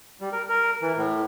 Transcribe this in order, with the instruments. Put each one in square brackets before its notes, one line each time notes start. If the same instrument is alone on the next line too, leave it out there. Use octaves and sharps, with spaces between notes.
[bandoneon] G3
A#4
A#4
E3
A2